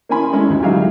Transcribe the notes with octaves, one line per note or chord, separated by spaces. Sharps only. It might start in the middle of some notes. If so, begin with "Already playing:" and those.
A#3 C#4 E4 G#5 B5 C6
G#3 A3 C#4 E4
D2 G#2
F#3 G#3 D#4 G4 E5 F5